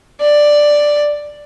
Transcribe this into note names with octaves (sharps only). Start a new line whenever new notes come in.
D5